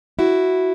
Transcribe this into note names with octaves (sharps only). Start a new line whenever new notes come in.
E4 F#4